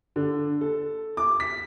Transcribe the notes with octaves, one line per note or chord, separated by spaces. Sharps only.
D3
A4
D6
B6